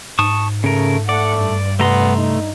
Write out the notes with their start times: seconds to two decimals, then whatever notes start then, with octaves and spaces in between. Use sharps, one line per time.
0.19 G#2 A5 C#6 D#6
0.64 C#3 A3 A#4
1.09 A3 D5 F#5
1.38 G2
1.80 C3 A3 B3 A#5 C6
2.18 D#4